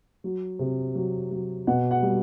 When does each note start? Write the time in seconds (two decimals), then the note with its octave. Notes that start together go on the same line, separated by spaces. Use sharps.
0.24 F#3
0.59 C3
0.95 F#3
1.31 F#3
1.67 B2 F#5
1.91 F#5
2.03 G3